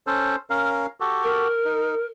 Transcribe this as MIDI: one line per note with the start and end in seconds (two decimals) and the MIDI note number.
0.07 0.36 61
0.07 0.36 69
0.07 0.36 72
0.50 0.86 61
0.50 0.86 70
0.50 0.86 77
1.00 1.48 66
1.00 1.48 67
1.00 1.48 69
1.23 2.05 70
1.65 1.95 63